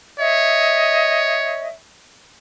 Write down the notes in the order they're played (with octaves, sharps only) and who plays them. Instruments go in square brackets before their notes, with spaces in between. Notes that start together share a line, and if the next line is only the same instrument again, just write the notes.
[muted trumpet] C#5 [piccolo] D#5 [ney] E5